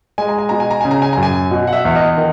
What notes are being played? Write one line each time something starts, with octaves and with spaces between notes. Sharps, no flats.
G#3 G#5
A#5
G#5
B2 A#5
G#5
A#5
C#3 G#5
A#5
G#5
F#2 A#5
G#5
B2
F#5
E5
E2
D#5
D#3